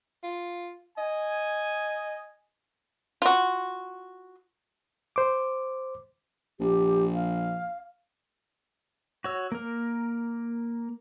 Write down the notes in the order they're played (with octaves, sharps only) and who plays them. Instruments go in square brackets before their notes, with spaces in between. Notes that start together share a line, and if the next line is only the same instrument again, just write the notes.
[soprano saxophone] F4
[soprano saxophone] D#5 [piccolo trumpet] G#5
[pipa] F4 F#4
[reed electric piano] C5 D6
[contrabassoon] A#1 [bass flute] G4
[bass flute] F5
[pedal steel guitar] F#4 C#5 E6
A#3 A#4